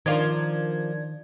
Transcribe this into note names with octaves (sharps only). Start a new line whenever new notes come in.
D#3 F3 D4 F4 A#4 D5 G#6